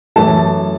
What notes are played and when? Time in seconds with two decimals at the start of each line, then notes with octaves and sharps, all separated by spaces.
0.16 F#2 E3 A3 A5